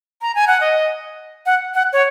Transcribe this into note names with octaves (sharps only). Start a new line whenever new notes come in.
A#5
G#5
F#5
D#5
F#5
F#5
C#5